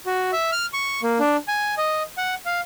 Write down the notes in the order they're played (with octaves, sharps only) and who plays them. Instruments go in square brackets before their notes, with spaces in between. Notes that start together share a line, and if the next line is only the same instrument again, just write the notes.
[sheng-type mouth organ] F#4
E5
F6
C#6
A#3
D4
G#5
D#5
F#5
F5